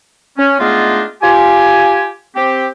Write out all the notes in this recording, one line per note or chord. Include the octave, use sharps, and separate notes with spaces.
C#4
G#3 A3 B3 D4 D#4 F4
F4 G4 G#5
C4 G4